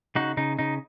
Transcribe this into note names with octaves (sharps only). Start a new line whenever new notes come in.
C#3 D#4 F#4
C#3 D#4
C#3 D#4